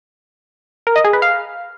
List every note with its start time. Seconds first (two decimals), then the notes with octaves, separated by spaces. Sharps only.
0.87 A#4
0.96 D#5
1.04 G#4
1.13 B4
1.22 F5